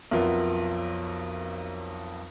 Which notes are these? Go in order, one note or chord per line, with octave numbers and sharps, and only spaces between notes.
B1 F2 B3 F4 A#4 E5